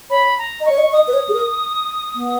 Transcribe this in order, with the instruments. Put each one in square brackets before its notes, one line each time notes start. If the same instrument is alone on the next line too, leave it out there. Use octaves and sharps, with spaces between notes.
[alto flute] C#5 [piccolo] B5
[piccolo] A#5
[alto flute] D#5
[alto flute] C#5 [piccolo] C#6
[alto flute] D#5
[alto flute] D#5 [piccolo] D#6
[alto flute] B4
C#5
G#4
A#4
B3